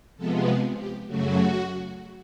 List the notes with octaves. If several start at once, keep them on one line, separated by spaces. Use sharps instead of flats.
C3 F3 G#3 B3 A4
G#4
G4
F#2 C#3 F#3 A3 F#4